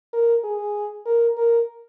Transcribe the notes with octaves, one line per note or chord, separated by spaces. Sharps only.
A#4
G#4
A#4
A#4